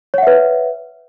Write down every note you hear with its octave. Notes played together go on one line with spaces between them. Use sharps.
B4 C#5 E5 F#5